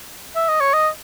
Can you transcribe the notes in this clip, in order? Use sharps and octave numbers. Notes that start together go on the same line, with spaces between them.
E5
D#5
C#5
D#5